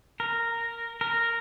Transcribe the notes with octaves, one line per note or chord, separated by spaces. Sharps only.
A#4
A#4